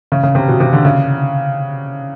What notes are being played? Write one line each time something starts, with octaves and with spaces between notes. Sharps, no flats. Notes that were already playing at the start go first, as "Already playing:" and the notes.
C#3
C#3
C3
B2
C3
D3
C#3